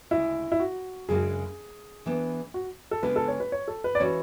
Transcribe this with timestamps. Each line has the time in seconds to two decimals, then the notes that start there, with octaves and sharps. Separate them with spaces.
0.11 D2 C#3 G#3 E4
0.52 E4
0.60 F#4
1.08 F#2 C#3 G#3 D4 F#4 G#4
2.06 E3 B3 D4
2.54 F#4
2.91 A4
3.03 C#3 G#3 B3 D4 B4
3.16 A4
3.28 C#5
3.40 B4
3.52 C#5
3.68 A4
3.84 B4
3.95 D5
4.00 E3 G#3 C#4 F#4 C#5